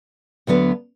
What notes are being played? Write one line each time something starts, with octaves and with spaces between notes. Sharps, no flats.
D2 D3 F#3 B3